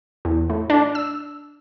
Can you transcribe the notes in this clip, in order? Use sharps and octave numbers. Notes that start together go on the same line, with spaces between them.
E2
A2
D4
E6